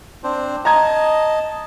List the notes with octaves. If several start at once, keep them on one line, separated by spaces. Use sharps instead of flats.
C4 D4 C5
D#5 A5 A#5 G#6